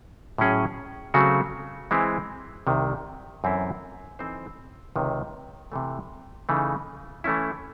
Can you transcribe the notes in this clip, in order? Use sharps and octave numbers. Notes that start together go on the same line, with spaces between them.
A2 F#3 C#4 G#4
C#3 F#3 A3 C4 F#4
E3 G#3 C4 E4
C2 C3 D#3
F#2 E3 C4 E4 A4
E3 C4 D#4 A4 C5
C#2 C3 D#3
C3 E3 A3
C#3 E3 A3 D#4
E3 A3 C#4 E4